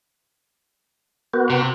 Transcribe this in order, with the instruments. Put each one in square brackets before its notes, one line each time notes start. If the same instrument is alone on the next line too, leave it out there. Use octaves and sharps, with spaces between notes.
[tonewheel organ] B3 F#4 [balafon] A#4
[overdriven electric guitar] C3